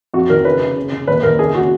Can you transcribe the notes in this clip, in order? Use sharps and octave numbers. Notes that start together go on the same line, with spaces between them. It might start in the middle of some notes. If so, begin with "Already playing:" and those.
F2 F#4
D#3 A#4
C#3 B4
C#3
C#3
C#3
D#2 B4
D#2 A#4
C#3 G#4
C#3 F#4